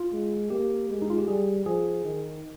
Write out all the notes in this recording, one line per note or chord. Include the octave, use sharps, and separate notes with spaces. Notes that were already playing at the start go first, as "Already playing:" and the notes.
Already playing: F4
G#3
A#3 G4
G#3
D#4
F4
G4
G3 G#4
F3 G#4
D#3